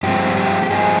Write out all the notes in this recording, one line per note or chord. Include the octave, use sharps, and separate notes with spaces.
G2 F3 G#3 C4 G4
G4
G4
G2 F3 G#3 C4 G#4